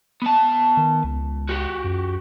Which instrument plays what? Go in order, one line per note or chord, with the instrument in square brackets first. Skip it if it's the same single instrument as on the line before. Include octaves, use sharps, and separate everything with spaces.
[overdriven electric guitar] B3 A5
[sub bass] D#3
C#2
[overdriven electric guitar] F#4 G4
[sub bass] F#2